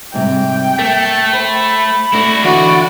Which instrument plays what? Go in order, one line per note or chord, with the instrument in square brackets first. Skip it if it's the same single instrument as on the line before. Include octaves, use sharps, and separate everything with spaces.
[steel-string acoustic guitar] G#2 C3 G3 [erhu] G5
[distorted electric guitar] A3 [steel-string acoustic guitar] A#3
[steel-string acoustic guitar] C5 [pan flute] B5
[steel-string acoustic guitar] A3 D5 [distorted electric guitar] E4 F#4
[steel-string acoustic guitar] D#2 D3 E3 [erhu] F#4 [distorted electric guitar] D5 D#5